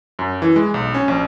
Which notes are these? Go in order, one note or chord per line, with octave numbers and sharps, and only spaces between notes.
F#2
E3
G#3
B1
C#4
A#1